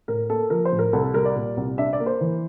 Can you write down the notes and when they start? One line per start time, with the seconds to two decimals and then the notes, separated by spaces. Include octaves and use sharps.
0.08 A2 A#4
0.30 A#3 A4
0.50 F3 A#4
0.65 C5
0.72 A2
0.79 A#4
0.93 C2 A4
1.04 A4
1.14 G3 A#4
1.25 D5
1.36 A#2
1.57 C2
1.78 D4 E5
1.93 D5
2.00 A#3
2.06 C5
2.21 E3